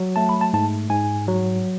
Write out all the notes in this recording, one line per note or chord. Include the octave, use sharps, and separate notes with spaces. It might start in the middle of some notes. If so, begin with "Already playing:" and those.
Already playing: F#3
A3 A5
B5
A5
G#2 A5
G#2 G#5
F#3